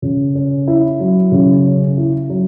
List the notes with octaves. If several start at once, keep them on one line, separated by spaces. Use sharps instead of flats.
C#3
C#4
E4
F#3
C#3
C#4
E4
F#3